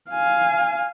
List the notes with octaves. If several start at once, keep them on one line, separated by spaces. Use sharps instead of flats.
F5 G#5